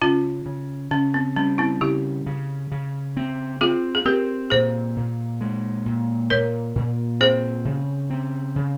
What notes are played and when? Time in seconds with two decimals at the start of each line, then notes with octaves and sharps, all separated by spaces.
0.02 C#3 C#4 F4
0.46 C#3
0.91 C#3 C#4
1.14 C4
1.36 G3 C#4
1.58 C4 E4
1.81 C#3 E4 G4
2.26 C#3
2.72 C#3
3.17 C4
3.61 C4 F4 G#4
3.95 G#4
4.05 C4 G4 A#4
4.50 A#2 G#4 C5
4.97 A#2
5.41 G#3
5.86 A#2
6.30 A#2 A#4 C#5
6.75 A#2
7.20 C4 G#4 C5
7.65 C#3
8.10 C4
8.56 C#3